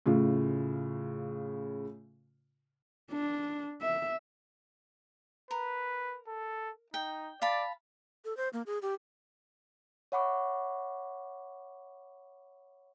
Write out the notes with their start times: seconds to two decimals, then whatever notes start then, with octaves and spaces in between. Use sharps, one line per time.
0.06 A2 C#3 F4
3.12 D4
3.81 E5
5.51 A#4 B4
6.28 A4
6.94 D#4 G5
7.42 D5 F5 A5 B5
8.25 A4
8.37 C5
8.53 A#3
8.66 G#4
8.82 G4
10.12 C#5 E5 F#5 B5 C#6 D6